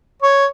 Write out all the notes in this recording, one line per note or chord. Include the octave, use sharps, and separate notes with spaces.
C#5